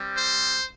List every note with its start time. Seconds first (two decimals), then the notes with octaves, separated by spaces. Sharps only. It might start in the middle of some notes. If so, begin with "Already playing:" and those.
Already playing: G3 C4 G4
0.16 C5